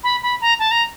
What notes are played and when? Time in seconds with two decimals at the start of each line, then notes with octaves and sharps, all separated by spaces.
0.03 B5
0.22 B5
0.41 A#5
0.59 A5
0.71 A#5